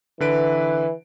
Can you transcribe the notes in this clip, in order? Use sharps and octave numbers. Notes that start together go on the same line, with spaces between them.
D3 E3 B4 D7